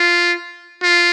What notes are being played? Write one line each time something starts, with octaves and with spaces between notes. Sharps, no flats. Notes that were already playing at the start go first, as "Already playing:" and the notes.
Already playing: F4
F4